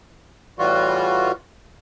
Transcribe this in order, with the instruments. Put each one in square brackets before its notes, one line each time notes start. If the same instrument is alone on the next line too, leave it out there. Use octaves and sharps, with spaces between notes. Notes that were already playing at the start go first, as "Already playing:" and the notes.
[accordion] A2 E3 G3 F4 F#4